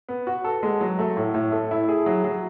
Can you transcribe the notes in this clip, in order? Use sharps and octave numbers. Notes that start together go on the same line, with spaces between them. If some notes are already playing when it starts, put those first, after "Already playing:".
B3
F#4
A4
G#3
F#3
A3
A2
A2
A3
E4
G#4
F#3
F#3